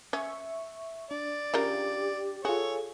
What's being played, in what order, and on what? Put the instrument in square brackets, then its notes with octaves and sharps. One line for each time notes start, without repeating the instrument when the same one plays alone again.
[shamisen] C#4 [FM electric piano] E5 C#6
[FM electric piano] D4 [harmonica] D5
[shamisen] C#3 F4 A#4 [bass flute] G4
[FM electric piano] F4 G#4 [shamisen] F#4 [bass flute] A4 [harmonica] C#5